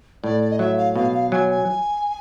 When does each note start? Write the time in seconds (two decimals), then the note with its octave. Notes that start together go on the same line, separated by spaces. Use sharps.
0.24 A2 D5
0.42 D5
0.51 D#5
0.59 F#3 E5
0.78 F5
0.95 B2 F5
1.14 F5
1.32 F#3 G#5
1.50 G#5